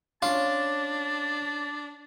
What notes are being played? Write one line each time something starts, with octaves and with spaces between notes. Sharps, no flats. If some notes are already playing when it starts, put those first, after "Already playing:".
C#4 D4 F4 C#5 A5